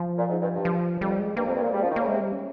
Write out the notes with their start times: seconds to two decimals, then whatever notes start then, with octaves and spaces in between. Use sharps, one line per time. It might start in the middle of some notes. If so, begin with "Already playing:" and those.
Already playing: F3
0.18 A#2
0.29 G#2
0.41 G2
0.54 G2
0.65 F3
1.01 F2 G3
1.19 G#3
1.36 G2 A#3
1.46 F2
1.49 C4
1.55 G2
1.61 A#2 A#3
1.72 G3 G#3
1.82 F3
1.84 C#4
1.90 D#3
1.96 C#3 A#3
2.08 C3 G#3
2.20 G3
2.32 C#4